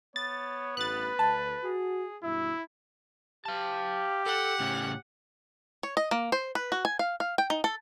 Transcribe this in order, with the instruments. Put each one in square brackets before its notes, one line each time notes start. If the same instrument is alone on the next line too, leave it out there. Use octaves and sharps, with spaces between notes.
[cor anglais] B3 [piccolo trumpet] C#5 [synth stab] A6
[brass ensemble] A1 G2 [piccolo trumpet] B4 [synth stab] F#6 A6
[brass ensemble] D2 [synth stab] A5
[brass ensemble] F#4 [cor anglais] G#4
[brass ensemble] G2 B2 E3 [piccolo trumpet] E4 [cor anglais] E5
[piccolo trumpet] G4 [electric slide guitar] F5 A5
[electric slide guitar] A4 [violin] F#5
[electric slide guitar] A2 C#3 C#4
[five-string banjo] C#5
D#5
A#3
C5
B4
F#4
G#5
F5
F5
G5
D#4
A4